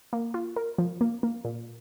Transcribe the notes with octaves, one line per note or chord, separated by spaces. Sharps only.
A#3
F4
A#4
F3
A#3
A#3
A#2